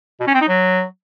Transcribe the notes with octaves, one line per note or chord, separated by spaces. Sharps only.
B2
C#4
C4
D#4
F#3